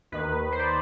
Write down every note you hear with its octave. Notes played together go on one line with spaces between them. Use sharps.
D#2 D#3 B4
C5
D5